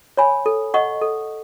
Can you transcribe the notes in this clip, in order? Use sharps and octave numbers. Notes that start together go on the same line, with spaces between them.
C#5 G#5 B5
A4
D#5 F#5 C#6
A4